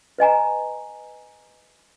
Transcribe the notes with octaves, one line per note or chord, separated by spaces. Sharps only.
B4 D#5 G#5 A#5